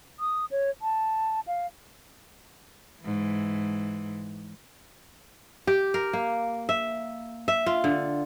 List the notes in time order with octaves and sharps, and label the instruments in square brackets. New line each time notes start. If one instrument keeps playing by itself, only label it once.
[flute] D#6
C#5
A5
F5
[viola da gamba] G#2 E3
[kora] G4
A#4
A#3
E5
E5
F4
D3